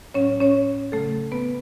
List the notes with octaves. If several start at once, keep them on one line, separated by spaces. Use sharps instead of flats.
A2 F#3 C#4 C#5
C#4 C#5
C#3 F#3 A3 A4
B3 B4